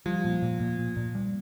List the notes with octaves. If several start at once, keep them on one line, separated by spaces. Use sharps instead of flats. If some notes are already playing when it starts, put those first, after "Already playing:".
F3 G3
A#2
A#2
A#2
A#2
A#2
G3